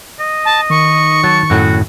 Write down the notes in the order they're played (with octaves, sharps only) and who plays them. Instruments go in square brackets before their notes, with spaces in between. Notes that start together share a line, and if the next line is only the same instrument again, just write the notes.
[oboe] D#5
[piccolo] A5
[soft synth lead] D#3 [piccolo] C#6
[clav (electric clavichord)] F#3 [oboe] A5
[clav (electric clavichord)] F#2 A2 F#3 [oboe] F#4